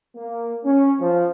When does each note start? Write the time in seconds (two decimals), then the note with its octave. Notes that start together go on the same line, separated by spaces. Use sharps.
0.16 A#3
0.65 C#4
1.00 F3